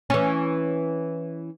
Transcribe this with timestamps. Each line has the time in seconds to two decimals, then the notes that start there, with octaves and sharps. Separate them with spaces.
0.10 E3 C#4